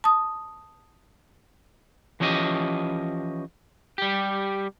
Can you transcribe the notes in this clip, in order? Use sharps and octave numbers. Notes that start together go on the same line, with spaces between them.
A5 D#6
E3 F3 C#4 G4 D#5
G3 G4